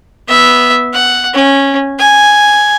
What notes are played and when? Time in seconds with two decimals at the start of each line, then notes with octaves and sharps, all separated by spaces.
0.28 B3 E5
0.94 F#5
1.34 C#4
1.99 G#5